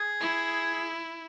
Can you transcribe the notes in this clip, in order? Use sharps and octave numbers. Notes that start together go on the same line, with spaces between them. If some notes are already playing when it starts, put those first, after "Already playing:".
Already playing: G#4
E4